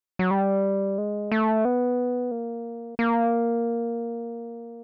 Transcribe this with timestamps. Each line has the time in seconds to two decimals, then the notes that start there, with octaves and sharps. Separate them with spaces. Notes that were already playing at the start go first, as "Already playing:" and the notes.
0.19 F#3
0.31 G3
0.98 G#3
1.32 A3
1.65 B3
2.31 A#3
2.99 A#3